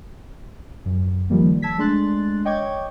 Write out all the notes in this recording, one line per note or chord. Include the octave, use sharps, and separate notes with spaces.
F#2
D#3 F3 G3 A#3
A5 E6 G#6 B6
G#3 A3 D4 C6 F#6 A6
C#5 D#5 G5 C#6 D6 G#6